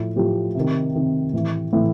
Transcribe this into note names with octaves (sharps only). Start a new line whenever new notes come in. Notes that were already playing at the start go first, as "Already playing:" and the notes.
Already playing: A2 F3
A2 F3 G4
C3 D#3
C3 D#3
A2 E3
A2 E3